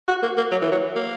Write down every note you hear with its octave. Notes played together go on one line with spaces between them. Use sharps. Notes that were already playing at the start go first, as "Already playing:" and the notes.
F#4
A#3
A#3
F#3
E3
F#3
A#3